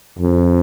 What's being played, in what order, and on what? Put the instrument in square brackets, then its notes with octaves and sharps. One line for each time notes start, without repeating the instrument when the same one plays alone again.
[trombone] F2